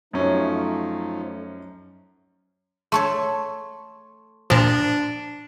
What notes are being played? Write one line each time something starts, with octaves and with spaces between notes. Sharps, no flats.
F#2 F3 A3 C#4 D#4
A3 A4 C#5 C6 C#6
A#2 F3 D4